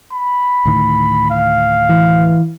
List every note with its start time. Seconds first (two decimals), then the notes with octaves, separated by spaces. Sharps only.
0.12 B5
0.65 D2 A2 D#3
1.30 F5
1.89 E3